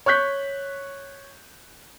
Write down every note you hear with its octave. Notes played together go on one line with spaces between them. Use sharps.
C#5 C#6 F#6 G6 B6